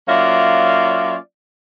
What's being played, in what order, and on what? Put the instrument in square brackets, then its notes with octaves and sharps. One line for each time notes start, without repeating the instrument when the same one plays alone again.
[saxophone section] F#3 A#3 C#4 F4 D5 E5